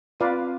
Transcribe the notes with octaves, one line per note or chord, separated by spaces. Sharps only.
C4 F4 B4 D5 F5